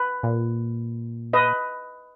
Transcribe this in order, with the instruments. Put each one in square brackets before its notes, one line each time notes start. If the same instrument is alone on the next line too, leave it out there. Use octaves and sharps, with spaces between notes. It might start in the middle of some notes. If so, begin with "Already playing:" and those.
Already playing: [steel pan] B4
[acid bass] A#2
[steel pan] B4 D#5